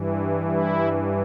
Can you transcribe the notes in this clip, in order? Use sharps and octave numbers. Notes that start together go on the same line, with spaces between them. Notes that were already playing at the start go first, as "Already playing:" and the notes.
Already playing: G2 E3
E4